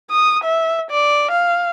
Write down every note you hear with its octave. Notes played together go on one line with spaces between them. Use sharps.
D#6
E5
D5
F5